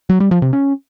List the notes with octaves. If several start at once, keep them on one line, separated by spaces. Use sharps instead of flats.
F#3
G3
F3
C3
C#4